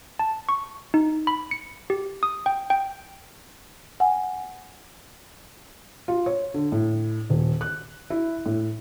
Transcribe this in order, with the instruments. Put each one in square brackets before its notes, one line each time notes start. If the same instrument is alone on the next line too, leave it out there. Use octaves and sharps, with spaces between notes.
[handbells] A5
C#6
D#4
B5
C#7
G4
D#6
G5
G5
[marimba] F#5 G#5
[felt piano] F4
C#5
D3
A2
D#1
F#6
E4
A2